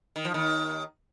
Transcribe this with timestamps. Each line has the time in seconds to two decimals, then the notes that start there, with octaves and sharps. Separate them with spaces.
0.16 D#3
0.25 F3
0.34 D#2 D#3